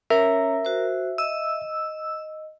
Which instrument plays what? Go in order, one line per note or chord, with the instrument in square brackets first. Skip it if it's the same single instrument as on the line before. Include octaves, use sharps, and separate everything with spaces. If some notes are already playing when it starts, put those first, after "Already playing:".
[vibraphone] C#4 C#5 A#5 [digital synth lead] A#4 [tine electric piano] E5
[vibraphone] F#4 C5
[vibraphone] D#5 [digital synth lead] E6